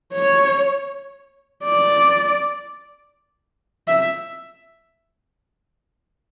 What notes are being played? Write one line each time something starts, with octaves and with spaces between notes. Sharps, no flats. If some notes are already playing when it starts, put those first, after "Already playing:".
C#5
D5
E5